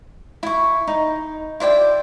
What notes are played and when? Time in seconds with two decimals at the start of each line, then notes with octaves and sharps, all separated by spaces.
0.43 E4 C#6
0.87 D#4
1.60 E4 C5 D5 G5